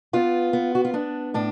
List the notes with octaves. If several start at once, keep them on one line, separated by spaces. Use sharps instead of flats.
B3 F4
B3
F#4
F4
B3 D4
A2 D4